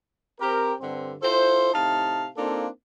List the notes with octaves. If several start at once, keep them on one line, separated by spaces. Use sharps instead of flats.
C4 G4 A#4
G2 D3 C4
E4 F4 A4 C5
A2 C3 D#4 F5 A5
A#3 C4 D4 D#4 F4 A4